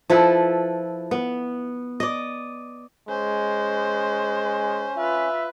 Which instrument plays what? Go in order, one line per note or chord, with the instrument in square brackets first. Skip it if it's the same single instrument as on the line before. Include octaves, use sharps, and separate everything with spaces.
[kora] F3 E4 A4 B4
B3
D5 D#5
[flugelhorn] G#3 [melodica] C#4 [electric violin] C5
[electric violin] F4 B4 [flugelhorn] E5